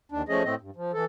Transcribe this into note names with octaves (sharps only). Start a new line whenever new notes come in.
D#2 D4
F3 A3 C#4 G#4 D#5
A2 A3 C4 D#5
G2
F3
E3 A4